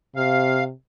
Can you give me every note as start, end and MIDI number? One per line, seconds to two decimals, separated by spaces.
0.16 0.73 48
0.16 0.64 77